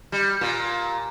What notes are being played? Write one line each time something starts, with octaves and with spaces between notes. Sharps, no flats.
G3
A#2